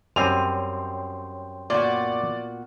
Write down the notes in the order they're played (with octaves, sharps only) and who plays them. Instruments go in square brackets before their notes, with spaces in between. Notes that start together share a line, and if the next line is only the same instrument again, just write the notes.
[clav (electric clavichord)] F#2 G3 C4 [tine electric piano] C#5 G5 C6 [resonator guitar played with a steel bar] G#5 [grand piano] F7
[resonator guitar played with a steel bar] A#2 B3 F#4 [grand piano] D5